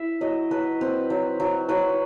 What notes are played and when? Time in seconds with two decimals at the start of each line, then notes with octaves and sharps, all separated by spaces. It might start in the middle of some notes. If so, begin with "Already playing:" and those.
Already playing: E4 E5
0.21 F#3 D#5
0.51 F#3 B4
0.81 C4 B4
1.10 F#3
1.40 F#3
1.69 F#3 B4